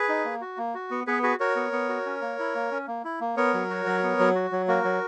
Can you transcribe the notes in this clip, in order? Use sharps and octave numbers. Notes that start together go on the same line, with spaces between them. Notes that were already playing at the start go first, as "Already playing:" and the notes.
Already playing: G#4 B4
D#4
A#3
F#4
A#3
F#4
B3
B3 G#4 B4
F#4 G#4 B4
F#4 A#4 C#5
B3
B3
F#4
C#4
A#3
E4
A#3
C#4
A#3
E4
A#3
B3 A#4 C#5
F#3
F#4
F#3
B3
F#3
F#4
F#3
A#3 F#4 A#4
F#3